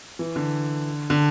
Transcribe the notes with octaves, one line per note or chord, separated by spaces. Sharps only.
E3
D3
D3